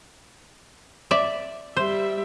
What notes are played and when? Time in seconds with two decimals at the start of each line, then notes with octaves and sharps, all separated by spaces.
1.11 D5 E5
1.76 G3 C5 E5